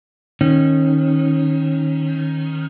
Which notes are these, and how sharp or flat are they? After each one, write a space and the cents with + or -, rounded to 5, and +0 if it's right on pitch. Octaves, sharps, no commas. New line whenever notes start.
D#3 +0 C#4 -25